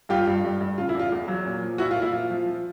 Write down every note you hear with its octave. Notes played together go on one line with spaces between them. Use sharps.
G2 F4 G4
G2
G2
G2
C#3 F4
E4
E2 F4
E2
F#3
A#2
F3
A#2 E4 F#4
F4
A#2
E4
F3 F4
F3
F3